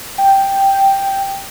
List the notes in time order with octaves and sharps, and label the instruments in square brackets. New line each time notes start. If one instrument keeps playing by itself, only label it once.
[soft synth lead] G5